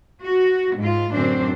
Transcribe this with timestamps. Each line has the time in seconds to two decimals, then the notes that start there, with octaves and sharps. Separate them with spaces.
0.24 F#4
0.78 G#2 F4
1.12 F#2 A2 D3 C4 D4 C5